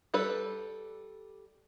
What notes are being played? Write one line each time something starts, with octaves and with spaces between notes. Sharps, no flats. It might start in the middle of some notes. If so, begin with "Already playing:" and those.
G3 A4 B4 D5